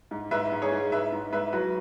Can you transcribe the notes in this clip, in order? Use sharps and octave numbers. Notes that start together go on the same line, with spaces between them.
G#2
G#2 B4 E5
G#2
G#4 C#5
G#2
G#2 B4 E5
G#2
G#2 B4 E5
F#3 F#4 B4